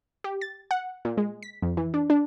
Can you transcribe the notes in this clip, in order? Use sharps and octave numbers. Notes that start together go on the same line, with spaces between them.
G4
A6
F#5
A#2
G#3
B6
F2
E3
D4
D4